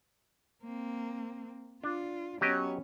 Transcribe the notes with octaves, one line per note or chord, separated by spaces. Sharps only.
A#3 C4
D4 F4
F#3 B3 C#4 G4 D#5